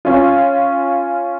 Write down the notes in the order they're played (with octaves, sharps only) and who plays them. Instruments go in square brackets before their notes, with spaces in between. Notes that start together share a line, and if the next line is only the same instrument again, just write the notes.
[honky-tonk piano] C#4 F4